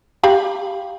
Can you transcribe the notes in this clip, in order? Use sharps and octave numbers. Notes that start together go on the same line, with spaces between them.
G4 F5 B5